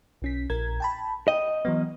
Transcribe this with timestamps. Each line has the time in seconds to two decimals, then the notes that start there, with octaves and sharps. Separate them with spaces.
0.22 B1 C#4 B6
0.50 A#1 A#4 G#6
0.80 G5 A5 B5
1.28 D#5 G5
1.65 E3 F#3 B3